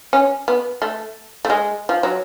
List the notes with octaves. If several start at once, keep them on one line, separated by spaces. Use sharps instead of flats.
C#4
B3
A3
A3
G#3
F3
F#3